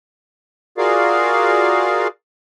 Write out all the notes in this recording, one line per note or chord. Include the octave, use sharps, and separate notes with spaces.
F4 F#4 G#4 A#4 D5 F5